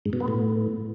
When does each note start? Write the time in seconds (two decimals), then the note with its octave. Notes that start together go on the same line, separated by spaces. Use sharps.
0.06 G#2
0.13 B2
0.20 B3
0.28 A2